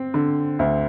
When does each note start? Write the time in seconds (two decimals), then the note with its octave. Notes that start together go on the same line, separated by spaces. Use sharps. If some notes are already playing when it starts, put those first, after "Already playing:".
Already playing: C4
0.14 D3
0.59 D2